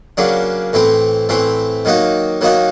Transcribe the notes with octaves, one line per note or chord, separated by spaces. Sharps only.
C#3 F#3 A#3 D4
A2 E3 A3 C4
A2 E3 A3 C4
D#3 F#3 A#3 D#4 F#4
D#3 F#3 A#3 D#4 F#4